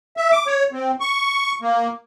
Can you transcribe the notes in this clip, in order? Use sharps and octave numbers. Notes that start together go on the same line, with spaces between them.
E5
D6
C#5
C4
C#6
A#3